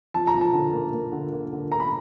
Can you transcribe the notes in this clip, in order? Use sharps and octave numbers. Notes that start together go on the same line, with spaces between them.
F3 A5
A#5
F3
A5
D3
A#3
A#3
D3
A#3
D3
A#3 A#5
B5